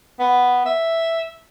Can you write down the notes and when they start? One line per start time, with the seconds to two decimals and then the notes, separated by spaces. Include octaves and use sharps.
0.19 B3
0.66 E5